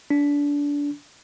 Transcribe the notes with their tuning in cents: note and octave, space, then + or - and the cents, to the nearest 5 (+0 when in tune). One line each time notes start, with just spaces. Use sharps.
D4 -25